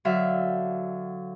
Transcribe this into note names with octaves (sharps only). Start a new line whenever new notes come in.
D3 F#3 E5 F5